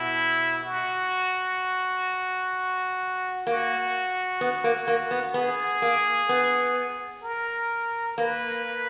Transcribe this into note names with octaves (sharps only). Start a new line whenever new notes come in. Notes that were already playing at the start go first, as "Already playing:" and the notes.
Already playing: B2 E4
F#4
A#3 F#4
B3
A#3
A#3
B3
B3 G#4
A#3
B3
A#4
A#3 B4